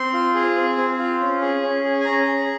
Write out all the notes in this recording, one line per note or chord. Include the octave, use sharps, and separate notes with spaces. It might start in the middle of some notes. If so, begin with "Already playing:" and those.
Already playing: C4 C6
F4
G#4
C4
C4
F4
C#4
G#4
C#4
G#4
G#5
C#4 A#5
G#4